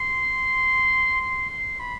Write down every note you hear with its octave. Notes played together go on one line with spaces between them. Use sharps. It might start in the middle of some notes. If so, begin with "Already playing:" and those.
Already playing: C6
C6
C6
B5